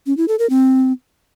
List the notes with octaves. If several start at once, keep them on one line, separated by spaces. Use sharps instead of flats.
C#4
E4
A4
A#4
C4